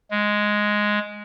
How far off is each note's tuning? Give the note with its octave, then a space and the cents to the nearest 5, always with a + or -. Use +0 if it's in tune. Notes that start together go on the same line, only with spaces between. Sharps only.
G#3 +5